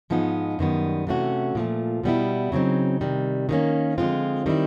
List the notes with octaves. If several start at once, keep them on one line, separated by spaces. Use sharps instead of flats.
G#2 F3 G#3 B3 D#4
F#2 D#3 G3 B3
C3 E3 A3 C#4 F#4
A#2 F3 A3
B2 G3 B3 E4
C#3 F#3 A3 C4 D#4
C3 D#3 G3
D#3 G3 A#3 C#4
D3 F3 G#3 C4 F4
D#3 G3 C4 E4